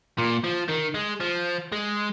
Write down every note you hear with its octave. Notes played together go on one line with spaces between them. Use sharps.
A#2
F3
D#3
G#3
F3
G#3